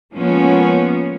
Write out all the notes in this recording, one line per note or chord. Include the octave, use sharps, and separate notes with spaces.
F3 G#3 A#3 B3 C#4